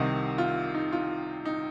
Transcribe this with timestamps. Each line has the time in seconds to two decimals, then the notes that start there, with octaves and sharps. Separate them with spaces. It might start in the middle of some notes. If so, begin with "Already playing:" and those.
Already playing: C2 C3 D#3 D#5
0.38 F4
0.75 D#4
0.92 F4
1.45 D#4